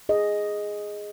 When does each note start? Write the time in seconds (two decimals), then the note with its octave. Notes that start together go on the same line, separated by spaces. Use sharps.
0.09 G#4 D#5